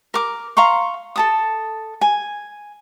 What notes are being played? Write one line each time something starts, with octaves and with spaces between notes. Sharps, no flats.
A#4 D6
F5 A#5 C6 C#6
A4 A5 D#6
G#5